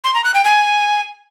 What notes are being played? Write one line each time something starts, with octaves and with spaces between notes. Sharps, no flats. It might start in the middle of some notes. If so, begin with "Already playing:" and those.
C6
A#5
F#6
G5
G#5